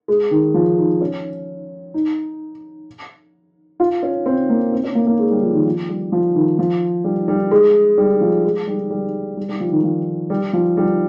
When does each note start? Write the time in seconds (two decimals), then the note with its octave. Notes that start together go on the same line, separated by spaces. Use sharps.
0.08 G#3
0.31 D#3
0.54 F3
0.78 D#4
1.01 C#4
1.94 D#4
3.80 F4
4.03 C#4
4.26 C4
4.50 A#3
4.73 C4
4.84 C#4
4.95 A#3
5.07 A#3
5.19 G#3
5.31 G3
5.42 F3
5.54 D#3
5.66 F3
5.89 G3
6.12 F3
6.35 D#3
6.59 F3
7.04 G3
7.28 G3
7.51 G#3
7.98 G3
8.21 F3
8.45 G#3
8.67 G3
8.90 G3
9.37 G3
9.49 G3
9.60 F3
9.72 D#3
9.83 F3
10.30 G3
10.53 F3
10.77 G3